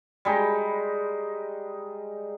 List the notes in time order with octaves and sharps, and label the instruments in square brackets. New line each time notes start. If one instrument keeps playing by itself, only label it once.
[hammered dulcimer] G3 G#3 D#4